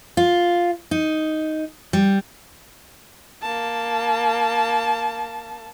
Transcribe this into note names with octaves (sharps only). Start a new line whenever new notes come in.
F4
D#4
G3
A#3 A5